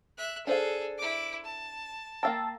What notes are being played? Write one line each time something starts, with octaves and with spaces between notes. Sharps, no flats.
E5 F#6
D4 G#4 A4 C5 F5
E4 D6
A5
A#3 F5 G5 A5 E6 A6